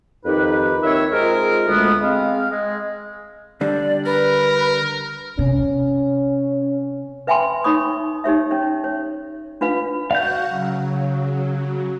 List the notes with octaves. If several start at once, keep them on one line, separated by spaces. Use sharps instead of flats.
F2 D#3 D#4 G4 B4
D#2 D#3 C4 C#5 E5
G#3 C4 F4 G#4 A#4
D2 D3 G#3 A3 B3
G#3 C4 F5
G#3
D3 G3 D4 D5
A#4 B4
C3 C#4
B4 E5 G5 G#5 B5 C6
D#4 C#5 B5 C#6 D#6
D#4 G4 C#5 E5
C#4 C#5
C#5
D4 F4 B4 F5
F#4 F5 F#5 G6
C#3 F#3